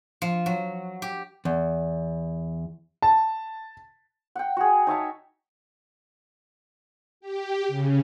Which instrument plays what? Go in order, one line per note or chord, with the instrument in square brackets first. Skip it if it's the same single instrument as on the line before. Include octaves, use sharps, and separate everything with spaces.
[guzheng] F3
F#3
G4
[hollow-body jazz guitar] E2
[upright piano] A5
[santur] F#5 G5
F#4 G#4
D#4 C#5 E5 A5
[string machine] G4
C#3